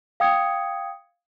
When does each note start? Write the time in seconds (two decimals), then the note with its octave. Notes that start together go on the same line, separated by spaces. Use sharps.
0.20 F5 G5 D#6 G#6 C#7